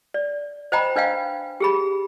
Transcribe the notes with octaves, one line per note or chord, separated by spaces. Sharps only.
D5
C5 D#5 G5 A#5 B5
D4 B4 D#5 F5 G5
G4 G#4 B5